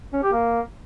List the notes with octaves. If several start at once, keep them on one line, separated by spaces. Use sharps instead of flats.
C#4
G4
A#3